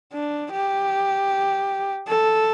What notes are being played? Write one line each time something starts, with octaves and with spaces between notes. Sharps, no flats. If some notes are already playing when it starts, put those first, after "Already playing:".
D4
G4
A4